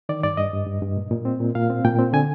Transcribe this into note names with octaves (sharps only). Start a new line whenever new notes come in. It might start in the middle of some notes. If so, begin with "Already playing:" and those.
D#3 D5
G2 D5
G2 D#5
G2
G2
G2
A#2
A#2
C4
A#2
A#2 F5
C4
A#2 G5
C4
D3 G#5